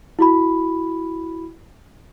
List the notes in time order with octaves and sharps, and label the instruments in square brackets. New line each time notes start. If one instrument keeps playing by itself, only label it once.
[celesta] E4 F#4 B5